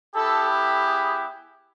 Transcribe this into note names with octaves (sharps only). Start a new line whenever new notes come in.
B3 E4 G4 A4
A4
G#4